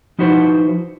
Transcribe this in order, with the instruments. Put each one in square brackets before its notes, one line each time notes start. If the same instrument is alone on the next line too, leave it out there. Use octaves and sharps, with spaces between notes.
[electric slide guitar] F3 D#4 E4 F#4 B4 C5